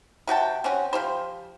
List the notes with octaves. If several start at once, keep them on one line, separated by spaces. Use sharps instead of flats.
C3 F#4 G5 A5
C4 C#4 F#4
F3 G4 C5